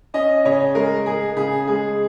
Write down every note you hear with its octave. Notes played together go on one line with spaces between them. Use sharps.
C#4 D#5
C#3 C#5
G#3 A#4
G#3 G#4
C#3 G#4
G#3 G#4